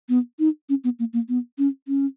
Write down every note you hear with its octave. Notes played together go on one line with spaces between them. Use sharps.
B3
D#4
C#4
B3
A#3
A#3
B3
C#4
C#4